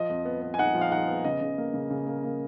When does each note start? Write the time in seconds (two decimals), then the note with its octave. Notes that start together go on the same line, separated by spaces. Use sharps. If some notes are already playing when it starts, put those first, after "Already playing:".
Already playing: F3 D#5
0.10 F2
0.25 B3
0.41 B3
0.54 G#5
0.58 D#4 F#5
0.74 F3
0.81 F5
0.92 D#4 F#5
1.08 B3
1.24 C#3 D#5
1.41 C#3
1.58 A#3
1.74 C#3
1.90 C#3
2.07 A#3
2.24 A#3